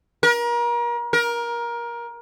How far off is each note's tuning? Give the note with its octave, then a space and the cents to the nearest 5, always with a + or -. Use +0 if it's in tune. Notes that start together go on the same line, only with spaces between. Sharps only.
A#4 +35
A#4 +20